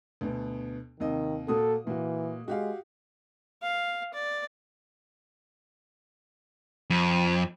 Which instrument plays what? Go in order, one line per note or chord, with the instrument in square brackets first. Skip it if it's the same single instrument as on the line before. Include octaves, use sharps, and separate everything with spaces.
[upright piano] D2 B2 B3
[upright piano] D#2 C3 D#5 [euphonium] D#3
[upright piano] A#2 F#4 D#6 [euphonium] A4
[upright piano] A#2 F#4 [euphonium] E3
[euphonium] G#3 [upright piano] F#4 G4 F5
[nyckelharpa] F5
D5
[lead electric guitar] F2